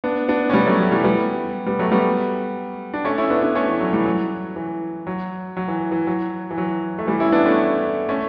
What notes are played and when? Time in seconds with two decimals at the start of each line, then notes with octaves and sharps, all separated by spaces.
0.04 B3 D4
0.28 B3 D4
0.50 C#4
0.53 G3 B3
0.66 F#3 A3
0.79 F#3
0.92 E3 G3
1.04 G3 B3
1.66 G3 B3
1.79 F#3 A3
1.92 G3 B3
2.94 D4
3.05 A3 C#4
3.18 C#4 E4
3.30 B3 D4
3.43 B3 D4
3.55 A3 C#4
3.68 E3
3.81 F#3
3.93 E3 G3
4.06 F#3
4.56 E3
5.07 F#3
5.57 F#3
5.68 E3
5.92 E3
6.07 F#3
6.51 E3
6.58 F#3
6.98 A3
7.07 E3 G3
7.20 C#4 E4
7.32 B3 D4
7.46 A3 C#4
8.09 A3 C#4